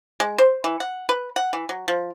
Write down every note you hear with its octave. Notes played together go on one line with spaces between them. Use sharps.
G#3
C5
E3
F#5
B4
F#5
E3
F#3
F3